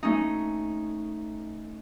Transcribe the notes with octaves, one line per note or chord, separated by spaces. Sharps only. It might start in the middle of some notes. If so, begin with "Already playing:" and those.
A3 C#4 D#4